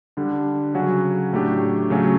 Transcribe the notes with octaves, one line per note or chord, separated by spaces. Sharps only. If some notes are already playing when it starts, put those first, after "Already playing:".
D3 G3 D4
C#3 F#3 C#4 F#4
A2 F#3 A3 D4 G4
C#3 F#3 A3 C#4